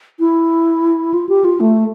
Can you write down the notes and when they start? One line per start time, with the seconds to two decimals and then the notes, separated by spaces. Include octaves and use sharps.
0.20 E4
1.14 F4
1.29 G4
1.44 F4
1.60 A3